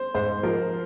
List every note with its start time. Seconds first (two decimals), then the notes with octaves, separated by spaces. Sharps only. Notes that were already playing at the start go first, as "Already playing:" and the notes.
Already playing: C5
0.15 G#2 C5
0.43 F3 A#4